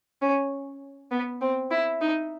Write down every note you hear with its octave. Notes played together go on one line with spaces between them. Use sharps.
C#4
B3
C4
E4
D#4